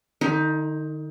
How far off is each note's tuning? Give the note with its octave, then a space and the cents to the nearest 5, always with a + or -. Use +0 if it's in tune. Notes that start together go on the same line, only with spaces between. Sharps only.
D#3 -45 D#4 +20